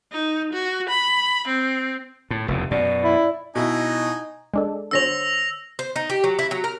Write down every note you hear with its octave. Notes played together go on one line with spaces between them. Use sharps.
D#4
F#4
B5
C4
A2
F1 E2 C#3
F#2 B2 D5
E4
B2 D#4 E4 D#5 G#5
G#3 D4 A4
D3 C5 C#5 E6 A#6 F7
C5
D#4
G4
F#3
E4
F#3
A#4